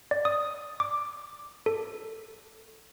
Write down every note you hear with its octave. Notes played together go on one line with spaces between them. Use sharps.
D5
D#6
D6
A4